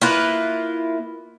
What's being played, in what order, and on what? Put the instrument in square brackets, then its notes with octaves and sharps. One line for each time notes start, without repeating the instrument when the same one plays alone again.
[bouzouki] A#3 E4 F4 B4